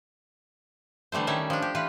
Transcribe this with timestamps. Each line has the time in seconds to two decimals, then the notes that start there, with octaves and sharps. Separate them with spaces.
1.12 D3 E3 G3 A3 C5
1.27 D#3 G3 C#4 E5
1.50 F3 D4
1.62 G4
1.75 E3 F4 B4